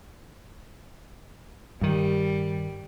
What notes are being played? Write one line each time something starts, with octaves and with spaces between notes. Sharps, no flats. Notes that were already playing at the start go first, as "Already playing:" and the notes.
G2 D#3 G3